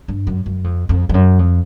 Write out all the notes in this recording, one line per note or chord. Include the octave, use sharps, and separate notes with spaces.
G2
F#2
F#2
F2
F2
F2
F#2
F2